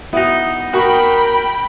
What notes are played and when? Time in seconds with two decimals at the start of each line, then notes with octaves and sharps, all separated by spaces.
0.13 B3 D#4 E4 F#4
0.73 F#4 A#4 G5 B5 C#6